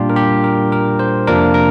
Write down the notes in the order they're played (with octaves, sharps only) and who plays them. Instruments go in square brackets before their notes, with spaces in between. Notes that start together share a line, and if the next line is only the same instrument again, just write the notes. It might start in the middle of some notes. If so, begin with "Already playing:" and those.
Already playing: [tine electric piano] A#2 G3 D4 F4 G4
A#4
G4
A#4
A#4
C5
F2 C3 F3 A#3 D4 A#4
A#4